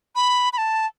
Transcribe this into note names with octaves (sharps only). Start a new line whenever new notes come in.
B5
B5
A5